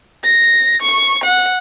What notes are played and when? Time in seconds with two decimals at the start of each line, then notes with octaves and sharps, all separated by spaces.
0.24 A#6
0.82 C#6
1.24 F#5